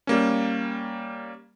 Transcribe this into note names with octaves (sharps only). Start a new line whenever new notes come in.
G3 A#3 C#4